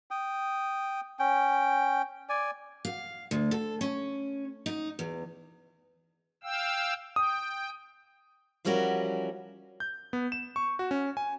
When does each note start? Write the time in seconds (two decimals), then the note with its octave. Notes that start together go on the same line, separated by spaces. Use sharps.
0.11 G5 D#6
1.19 C#4 G5
2.29 D5 G#5
2.85 F5
3.31 D2
3.51 A4
3.81 C#4
4.66 D#4
4.99 E2
6.43 F5 G5 E6
7.16 G5 D#6
8.65 E3 F3 G3 C#4 F#4 A#4
9.80 G6
10.13 B3
10.32 E7
10.56 C#6
10.79 F#4
10.91 C#4
11.17 G#5